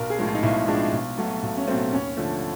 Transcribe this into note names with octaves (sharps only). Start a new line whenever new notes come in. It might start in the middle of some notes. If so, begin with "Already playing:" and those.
Already playing: B1 A#4
G#4
A2 F3 G#3
F4
D#4
B1 E4
A2 F3 G#3 D4
B1
B2 F#3 A3
B1
C#4
B2 F#3 A3 C4
D#2 C#4
D3 F3 A3